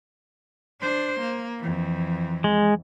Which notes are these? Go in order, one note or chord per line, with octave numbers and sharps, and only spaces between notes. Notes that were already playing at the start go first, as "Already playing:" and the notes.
D4 C5
A#3
F2 E3
G#3